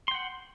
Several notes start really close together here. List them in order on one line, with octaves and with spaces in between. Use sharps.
C6 G5 F#5